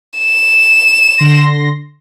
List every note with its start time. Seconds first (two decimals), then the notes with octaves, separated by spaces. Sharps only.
0.18 E7
1.18 D3 C6 A#6